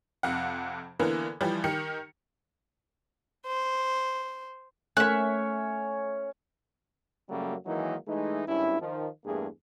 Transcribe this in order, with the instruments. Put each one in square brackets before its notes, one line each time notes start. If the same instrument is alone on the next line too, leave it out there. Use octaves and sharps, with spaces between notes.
[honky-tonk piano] F2 C3 F5 F#5
D3 E3 A#3 B3 A#4
E3 F3 G3 G4
D#3 G4 A#4 C#7
[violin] C5
[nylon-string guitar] A3 [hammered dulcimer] C#4 C#5 [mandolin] E5 F#6
[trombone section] F#2 C#3 F#3 G3 A3 A#3
D#3 E3 F#3 G#3 A#3 D#4
E3 G#3 A3 D#4
G#1 G2 C#4 E4
D#3 F3
E2 G2 A3 A#3 G#4